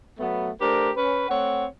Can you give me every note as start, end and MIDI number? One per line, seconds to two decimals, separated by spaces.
0.19 0.50 54
0.19 0.50 57
0.19 0.50 59
0.60 0.90 57
0.60 0.90 62
0.60 0.90 67
0.60 0.90 70
0.60 0.90 72
0.96 1.27 61
0.96 1.27 71
1.29 1.65 57
1.29 1.65 60
1.29 1.65 73
1.29 1.65 78